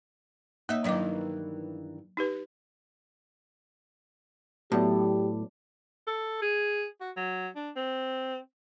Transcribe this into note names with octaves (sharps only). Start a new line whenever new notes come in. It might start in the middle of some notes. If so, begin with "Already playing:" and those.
A#3 D#4 E5
G2 D#3 E3 F#3 D#5 D6
D#4 G4 B4
A2 F#3 B3 G4 D5
A4
G#4
F#4
F#3
D4
C4